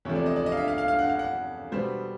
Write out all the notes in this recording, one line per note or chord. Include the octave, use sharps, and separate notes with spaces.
E2 C3 F3 A3 C4 C#5
D5
D#5
D5
D#5
F5
E5
F5
F5
F5
F#5
F5
F#5
B2 G3 B3 C5